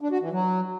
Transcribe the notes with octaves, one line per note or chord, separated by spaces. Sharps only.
D4
F#4
E3
F#3